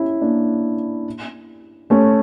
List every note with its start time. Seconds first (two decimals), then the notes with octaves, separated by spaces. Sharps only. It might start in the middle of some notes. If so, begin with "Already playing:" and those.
Already playing: C#4 E4
0.22 A#3 D4
1.90 A3 C#4